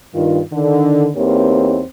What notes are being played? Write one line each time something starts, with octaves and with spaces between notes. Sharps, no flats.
G2 D#3 F4
D3 D#3
E2 A#3 C4 D#4 G4 C#5